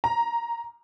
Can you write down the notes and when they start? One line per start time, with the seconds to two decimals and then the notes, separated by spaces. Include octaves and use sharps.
0.04 A#5